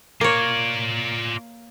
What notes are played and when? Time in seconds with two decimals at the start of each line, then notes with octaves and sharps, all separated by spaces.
0.21 A#3 F4 C#5 D5